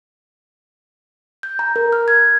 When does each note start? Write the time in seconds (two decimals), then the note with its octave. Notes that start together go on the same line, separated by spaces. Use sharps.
1.43 G6
1.59 A#5
1.76 A#4
1.93 F6
2.08 G#6